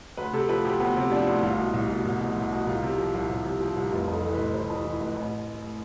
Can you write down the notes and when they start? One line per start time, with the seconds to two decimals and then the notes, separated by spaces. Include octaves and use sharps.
0.17 D2 B4
0.33 C3 A4
0.49 F3 B4
0.64 D2 G4
0.80 D2 B3
0.96 C3 C4
1.11 F3 D4
1.27 D2 E4
1.43 C2 F4
1.58 B2
1.74 C2
1.89 B2
2.05 C2
2.20 B2
2.36 C2
2.52 B2
2.67 C2 F4
2.82 C3
2.98 F3
3.14 C2
3.29 C2
3.45 C3
3.60 F3
3.76 C2
3.92 F1 F4
4.07 F2
4.12 A4
4.23 E3 A4
4.33 B4
4.38 F1
4.54 F1 C5
4.70 F2
4.85 E3
5.00 F1
5.16 A1